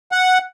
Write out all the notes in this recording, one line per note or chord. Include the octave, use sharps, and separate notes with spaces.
F#5